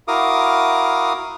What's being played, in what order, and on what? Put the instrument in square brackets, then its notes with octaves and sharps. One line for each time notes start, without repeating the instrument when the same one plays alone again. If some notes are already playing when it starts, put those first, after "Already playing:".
[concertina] E4 F#4 A#4 F5 D6 D#6